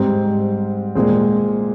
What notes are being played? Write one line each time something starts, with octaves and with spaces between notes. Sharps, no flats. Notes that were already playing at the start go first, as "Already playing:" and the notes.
Already playing: G#2 G3 C4
A#2 G#3 C4